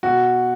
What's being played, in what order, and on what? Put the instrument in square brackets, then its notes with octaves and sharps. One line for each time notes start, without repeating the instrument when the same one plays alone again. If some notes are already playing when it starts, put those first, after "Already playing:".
[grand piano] B2 F#4